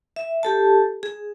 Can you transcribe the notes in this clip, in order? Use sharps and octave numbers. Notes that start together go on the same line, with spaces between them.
E5
G4 A4 A5
G#4